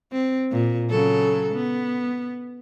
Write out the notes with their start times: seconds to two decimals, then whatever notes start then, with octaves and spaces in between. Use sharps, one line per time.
0.12 C4
0.52 A#2
0.90 C#3 F#3 A4
1.54 B3